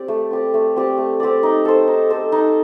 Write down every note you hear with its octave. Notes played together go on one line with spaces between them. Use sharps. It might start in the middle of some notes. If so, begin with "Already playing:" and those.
Already playing: C4 G4 D5
A3
C4 G4 D5
A3
C4 G4 D5
A3
C4 G4 D5
D#4
A4 C5
D#4
A4 C5
D#4